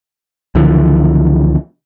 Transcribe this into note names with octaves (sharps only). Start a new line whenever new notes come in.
C#2 D3 E3 F3